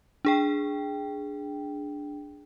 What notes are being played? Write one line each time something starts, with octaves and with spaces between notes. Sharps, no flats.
D4 G#4 G5